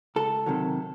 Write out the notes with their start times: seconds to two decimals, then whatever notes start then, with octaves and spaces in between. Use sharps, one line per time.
0.16 C#2 A4
0.46 C3 D#3 F#3